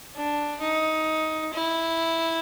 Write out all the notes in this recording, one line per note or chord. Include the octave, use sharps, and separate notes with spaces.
D4
D#4
E4